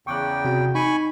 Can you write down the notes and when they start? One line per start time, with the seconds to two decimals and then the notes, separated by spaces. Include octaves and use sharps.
0.07 E2 C#3 G5 C#6 D6 F#6
0.45 C3 F#4
0.75 D#4 G#5 B5 C#6